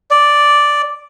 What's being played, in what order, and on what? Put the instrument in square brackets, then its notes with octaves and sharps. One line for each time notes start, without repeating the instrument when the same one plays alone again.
[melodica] D5